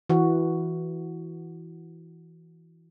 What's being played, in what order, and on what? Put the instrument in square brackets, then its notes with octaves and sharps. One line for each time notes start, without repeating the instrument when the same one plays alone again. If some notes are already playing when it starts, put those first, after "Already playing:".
[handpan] E3 F#4